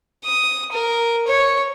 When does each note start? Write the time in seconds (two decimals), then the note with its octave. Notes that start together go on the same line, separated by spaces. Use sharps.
0.25 D#6
0.73 A#4
1.27 C#5